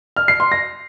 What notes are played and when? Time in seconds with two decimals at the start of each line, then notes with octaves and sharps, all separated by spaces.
0.17 F6
0.28 C7
0.40 C6
0.52 A#6